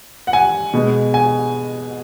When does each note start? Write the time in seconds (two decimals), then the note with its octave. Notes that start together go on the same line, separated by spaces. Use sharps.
0.27 F#5
0.33 G#5
0.74 B2 G#3
1.14 G#5